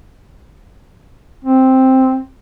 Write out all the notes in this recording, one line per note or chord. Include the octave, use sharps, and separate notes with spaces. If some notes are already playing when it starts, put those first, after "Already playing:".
C4